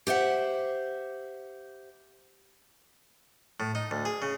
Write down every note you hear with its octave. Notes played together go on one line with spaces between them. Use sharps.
G4 C5 E5 F#5
A2
D#4
D2
G#4
C#3